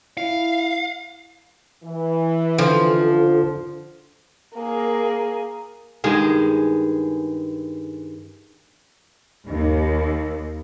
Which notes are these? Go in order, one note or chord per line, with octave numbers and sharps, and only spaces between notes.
E4 F5
E3
D3 F3
A#3 G#4
G2 D#3 G#3 G#4
D#2